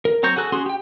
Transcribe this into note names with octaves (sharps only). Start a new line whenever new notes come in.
A#4
F#3 C4 A#5 C#6 G6
F#4 G#4 A4 F#6
C#4 F#4 G#4 C6
G4 G5